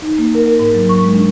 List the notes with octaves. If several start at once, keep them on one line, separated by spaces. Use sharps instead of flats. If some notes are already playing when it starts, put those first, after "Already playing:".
D#4
A#3
A#4
A#4
G#2
F#3
C#6
G#3
D4